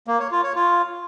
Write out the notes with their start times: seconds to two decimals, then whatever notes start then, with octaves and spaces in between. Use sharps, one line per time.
0.07 A#3
0.19 C#5
0.31 F4
0.43 C#5
0.55 F4